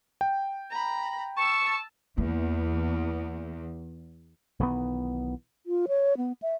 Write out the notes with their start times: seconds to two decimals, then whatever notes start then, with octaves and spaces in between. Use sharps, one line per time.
0.21 G5
0.70 A#5 B5
1.36 A5 C#6 E6
2.18 E2 A#3
4.59 B1 D#3 E3 B3
5.66 F4
5.88 C#5
6.17 B3
6.42 E5